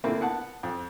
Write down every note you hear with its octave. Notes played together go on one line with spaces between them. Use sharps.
D3 A3 A#3 C4 E4
B3 F#5 A5
F2